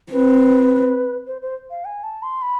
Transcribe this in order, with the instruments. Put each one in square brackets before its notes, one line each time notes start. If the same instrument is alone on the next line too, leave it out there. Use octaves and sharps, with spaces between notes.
[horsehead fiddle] C4 [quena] B4
[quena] C5
C5
F5
G#5
A5
C6
B5